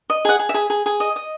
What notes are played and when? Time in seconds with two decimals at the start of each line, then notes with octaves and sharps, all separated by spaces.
0.10 D#5
0.25 G#4 F#5
0.39 G#4
0.49 E5
0.54 G#4
0.70 G#4
0.86 G#4
1.00 D#5
1.16 D#5